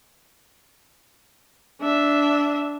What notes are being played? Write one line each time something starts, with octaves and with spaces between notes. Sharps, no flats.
D4 E5